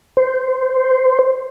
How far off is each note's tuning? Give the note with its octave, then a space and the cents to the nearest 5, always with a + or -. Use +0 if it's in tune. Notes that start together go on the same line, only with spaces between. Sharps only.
C5 -10